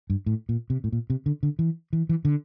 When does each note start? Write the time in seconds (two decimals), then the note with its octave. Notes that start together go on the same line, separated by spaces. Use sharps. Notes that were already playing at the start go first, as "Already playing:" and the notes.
0.10 G2
0.26 A2
0.49 A#2
0.70 C3
0.84 A2
0.92 A#2
1.10 C3
1.26 D3
1.43 D3
1.59 E3
1.93 E3
2.09 E3
2.25 D3